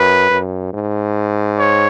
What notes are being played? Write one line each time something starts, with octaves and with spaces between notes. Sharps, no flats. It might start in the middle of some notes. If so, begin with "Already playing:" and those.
Already playing: F#2 B4
F#2
G#2
C#5